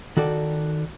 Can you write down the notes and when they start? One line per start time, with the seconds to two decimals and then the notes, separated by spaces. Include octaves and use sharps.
0.17 D#3 F#4 A4 D5